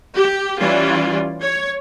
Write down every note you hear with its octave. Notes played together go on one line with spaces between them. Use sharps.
G4
E3 G3 C#4 F4 D5
C#5